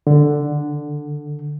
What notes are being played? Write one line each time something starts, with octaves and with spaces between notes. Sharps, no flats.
D3